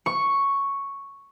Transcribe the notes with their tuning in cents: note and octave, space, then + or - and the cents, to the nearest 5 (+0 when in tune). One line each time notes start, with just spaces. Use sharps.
C#6 +0